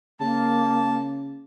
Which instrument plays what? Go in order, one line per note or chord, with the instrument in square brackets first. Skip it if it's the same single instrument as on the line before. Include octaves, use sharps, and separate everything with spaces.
[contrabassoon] C#3 [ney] A#3 [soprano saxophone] A5